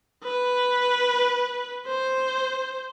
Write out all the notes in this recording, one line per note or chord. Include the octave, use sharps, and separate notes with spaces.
B4
C5